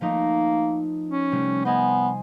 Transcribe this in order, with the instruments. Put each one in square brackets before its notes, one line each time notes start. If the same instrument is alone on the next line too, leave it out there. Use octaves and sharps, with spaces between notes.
[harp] F3 A3 D#4 [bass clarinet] A#3
[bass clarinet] C#4
[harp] C3 G3 A3
[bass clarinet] B3 [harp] C5 D#5 G#5